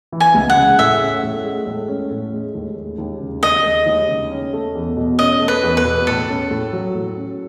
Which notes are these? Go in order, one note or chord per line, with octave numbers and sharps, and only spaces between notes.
E3
G#5
C#2
F#5
C#3
A2 E5
C#4
A2
G#3
A2
C#4
A2
G#3
D#2
G#3
D#2
C#3
D#2 D#5
G#3
D#2
C#3
C#4
A3
E2
B2
C#4 D#5
A3
B4
E2
B4
B2
A2 A4
C#4
A2
F#3
A2
C#4